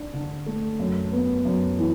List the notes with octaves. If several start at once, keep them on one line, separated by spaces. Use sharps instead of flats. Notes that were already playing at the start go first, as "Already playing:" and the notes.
Already playing: D4
D3
A3
F#2
B3
F#2
E3